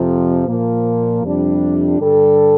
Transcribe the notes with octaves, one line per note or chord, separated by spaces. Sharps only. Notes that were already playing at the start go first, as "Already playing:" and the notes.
Already playing: F2 C3 F3
A#2 F3 A#3
F2 C3 G3 D4
G2 D3 G3 D4 A4